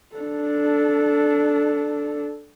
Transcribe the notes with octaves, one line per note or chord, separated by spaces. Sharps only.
D4 A4